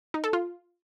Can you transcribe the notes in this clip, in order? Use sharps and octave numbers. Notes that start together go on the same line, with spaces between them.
D#4
A4
F4